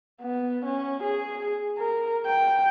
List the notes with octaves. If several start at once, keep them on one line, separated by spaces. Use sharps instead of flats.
B3
C#4
G#4
A#4
G5